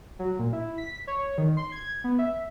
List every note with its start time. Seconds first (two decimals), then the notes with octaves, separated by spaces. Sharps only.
0.19 F#3
0.39 A#2
0.53 E4
0.78 B6
1.07 C#5
1.38 D#3
1.57 C6
1.72 G#6
2.04 B3
2.19 E5